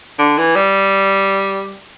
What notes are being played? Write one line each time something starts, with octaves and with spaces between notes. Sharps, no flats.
D3
E3
G3